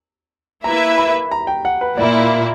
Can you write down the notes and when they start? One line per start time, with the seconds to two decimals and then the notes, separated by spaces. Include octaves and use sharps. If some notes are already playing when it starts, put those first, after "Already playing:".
0.64 A#3 E4 B4 E5 A#5
0.98 B5
1.31 A#5
1.47 G5
1.65 F#5
1.81 B4
1.97 A#2 A#3 E4 D5
2.19 E5